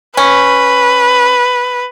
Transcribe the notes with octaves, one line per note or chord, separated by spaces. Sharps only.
C#4 B4